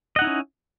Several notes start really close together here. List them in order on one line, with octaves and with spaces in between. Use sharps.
D#5 F#5 D#4 E4 C#4